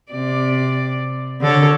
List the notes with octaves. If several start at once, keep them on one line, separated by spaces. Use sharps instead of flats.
C3 D5
D3 A4 C#5